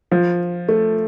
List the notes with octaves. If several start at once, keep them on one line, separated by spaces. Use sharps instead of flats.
F3
A3